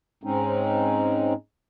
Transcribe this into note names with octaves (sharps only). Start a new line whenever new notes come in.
G#2 G#3 C4 C#4 D#4